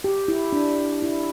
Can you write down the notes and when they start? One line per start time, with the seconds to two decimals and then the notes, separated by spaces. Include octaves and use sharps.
0.04 G4
0.28 E4
0.53 D4
1.02 E4